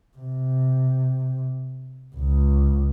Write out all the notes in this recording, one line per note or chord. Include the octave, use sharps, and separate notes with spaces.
C3
C#2